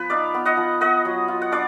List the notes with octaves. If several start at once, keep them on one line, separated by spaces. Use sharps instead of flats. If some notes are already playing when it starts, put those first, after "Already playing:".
Already playing: F3 B3 B4
D#4 D5 F5
B3
D#5 F#5
F3
B3 D#5 F#5
F#3
F4
F#5
D4 D5 F5